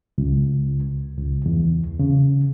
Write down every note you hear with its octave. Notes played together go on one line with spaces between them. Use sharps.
C#2
C#2
E2
C#3